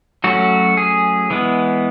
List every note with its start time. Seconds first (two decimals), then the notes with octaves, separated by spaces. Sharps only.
0.24 F#3 A3 C#4 F#4
0.77 G#4
1.30 E3 G#3 B3